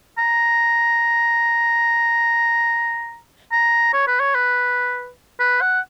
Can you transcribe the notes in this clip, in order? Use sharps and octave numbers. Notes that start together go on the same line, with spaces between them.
A#5
A#5
C#5
B4
C#5
B4
B4
F#5